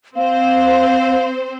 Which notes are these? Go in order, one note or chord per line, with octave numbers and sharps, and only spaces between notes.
C4 C5 F5